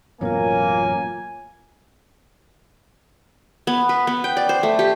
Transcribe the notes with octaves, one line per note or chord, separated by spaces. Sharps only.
A1 F#2 B2 A#3 F4 A#4 C#5 G#5
B3
B4
B3
G5
D5
C5
A3
G4